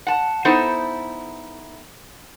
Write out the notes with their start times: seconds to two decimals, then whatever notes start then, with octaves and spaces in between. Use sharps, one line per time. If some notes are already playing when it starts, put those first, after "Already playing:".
0.07 F#5 A5
0.45 B3 D#4 E4 A4 C5